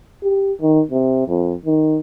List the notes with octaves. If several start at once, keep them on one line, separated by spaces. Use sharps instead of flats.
G4
D#3
C3
F2
D#3